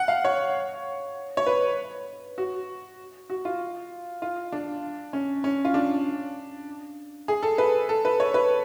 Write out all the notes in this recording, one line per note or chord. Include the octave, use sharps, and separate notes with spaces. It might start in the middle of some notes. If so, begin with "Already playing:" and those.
Already playing: F#5
F5
C#5
C#5
B4
F#4
F#4
F4
F4
D4
C#4
C#4
F4
D4
G#4
A4
B4
A4
B4
C#5
B4